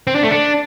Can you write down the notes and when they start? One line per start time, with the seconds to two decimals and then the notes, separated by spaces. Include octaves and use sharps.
0.07 C4
0.15 D4
0.23 A3
0.31 D4